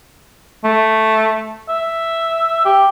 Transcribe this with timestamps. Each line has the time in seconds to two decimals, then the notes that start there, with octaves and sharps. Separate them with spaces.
0.64 A3
1.69 E5
2.65 G4